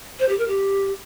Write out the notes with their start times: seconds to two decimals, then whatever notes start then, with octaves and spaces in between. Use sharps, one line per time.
0.19 C5
0.29 G4
0.38 A#4
0.48 G4